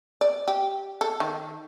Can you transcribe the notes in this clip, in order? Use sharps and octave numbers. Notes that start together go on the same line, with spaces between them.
D5
G4
A4
D#3